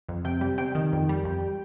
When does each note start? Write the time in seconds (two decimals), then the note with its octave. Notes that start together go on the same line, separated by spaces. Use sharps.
0.09 F2
0.25 C3 G5
0.41 G3
0.58 C3 G5
0.75 D#3
0.93 F2
1.09 G3
1.25 F2